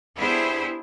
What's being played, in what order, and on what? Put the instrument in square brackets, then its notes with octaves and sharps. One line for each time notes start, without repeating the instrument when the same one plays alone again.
[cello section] B3 D4 E4 G4 G#4 C5